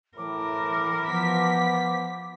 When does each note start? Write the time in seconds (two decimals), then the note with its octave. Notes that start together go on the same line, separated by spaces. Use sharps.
0.17 A2 E3 A#4 D6
1.08 F3 B3 B6